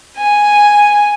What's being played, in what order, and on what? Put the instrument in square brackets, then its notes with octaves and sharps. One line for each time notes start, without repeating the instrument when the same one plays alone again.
[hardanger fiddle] G#5